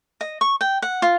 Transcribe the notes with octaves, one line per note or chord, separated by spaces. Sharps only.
D#5
C#6
G5
F#5
F4